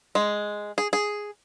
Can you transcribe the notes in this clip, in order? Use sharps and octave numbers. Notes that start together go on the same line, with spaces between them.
G#3
G#4
G#4